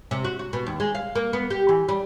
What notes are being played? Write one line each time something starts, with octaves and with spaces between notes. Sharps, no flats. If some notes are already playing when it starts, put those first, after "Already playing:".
C3
F#4
F#4
B2
D#2
G#3
F5
A#3
B3
G4
E3
G3